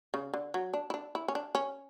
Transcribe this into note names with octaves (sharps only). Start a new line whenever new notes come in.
C#3
D3
F#3
D4
E4
D4
E4
C#4
D4
C#4